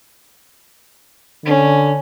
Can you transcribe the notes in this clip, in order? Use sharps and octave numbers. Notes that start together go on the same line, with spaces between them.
D3 C#4